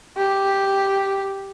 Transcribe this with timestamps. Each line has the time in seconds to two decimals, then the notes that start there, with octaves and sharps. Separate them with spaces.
0.18 G4